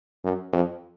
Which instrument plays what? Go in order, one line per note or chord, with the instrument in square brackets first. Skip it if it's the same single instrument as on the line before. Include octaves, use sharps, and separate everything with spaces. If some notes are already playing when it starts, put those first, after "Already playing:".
[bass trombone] F#2
F2